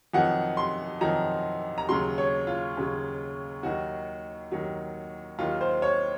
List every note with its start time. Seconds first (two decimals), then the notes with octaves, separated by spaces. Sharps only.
0.14 F2 D#3 F#3 F#5
0.57 C6
1.01 F2 D#3 F#3 A#5
1.78 A#5
1.89 D#2 C#3 F#3 C6
2.18 C#5
2.47 F4
2.77 D#2 C#3 F#3
3.63 D#2 D#3 F#3 F#4
4.52 D#2 D#3 F#3
5.38 D#2 D#3 F#3 F4
5.61 C5
5.82 C#5